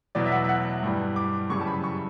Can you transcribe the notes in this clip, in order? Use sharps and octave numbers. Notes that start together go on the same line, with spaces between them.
E2 B2 F#3 D5
E5
F#5
E5
F#5
G2 E3 G3
D6
F#2 C#3 E3 G3 C#6
A5
B5
C#6